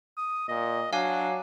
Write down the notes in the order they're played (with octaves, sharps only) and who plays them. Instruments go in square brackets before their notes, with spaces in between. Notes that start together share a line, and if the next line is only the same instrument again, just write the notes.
[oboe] D#6
[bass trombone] A#2 [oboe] D#5
[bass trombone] F#3 [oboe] D4 [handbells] F5 G#5